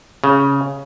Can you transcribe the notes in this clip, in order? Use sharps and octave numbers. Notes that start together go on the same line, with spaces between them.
C#3